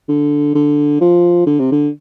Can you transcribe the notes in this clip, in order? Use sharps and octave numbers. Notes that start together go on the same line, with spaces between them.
D3
D3
F3
D3
C3
D3